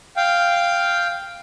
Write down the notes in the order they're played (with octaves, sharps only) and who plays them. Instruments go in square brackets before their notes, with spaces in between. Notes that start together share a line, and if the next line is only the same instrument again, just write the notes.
[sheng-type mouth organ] F5 G5